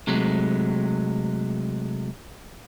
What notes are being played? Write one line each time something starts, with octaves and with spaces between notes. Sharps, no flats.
C3 F#3 G#3 A3